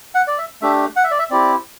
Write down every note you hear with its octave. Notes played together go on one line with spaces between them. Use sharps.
F#5
D5
E5
A3 D4 G4 E5
F#5
E5
D5
E5
C4 E4 G4 D5